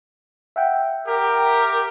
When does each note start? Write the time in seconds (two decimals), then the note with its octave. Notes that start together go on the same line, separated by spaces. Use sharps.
0.56 E5 F#5 G5
1.06 G4 A#4